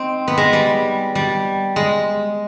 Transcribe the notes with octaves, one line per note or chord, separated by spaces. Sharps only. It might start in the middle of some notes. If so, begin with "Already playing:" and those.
Already playing: C4 D#4
B3
G#3
G3
G3
G#3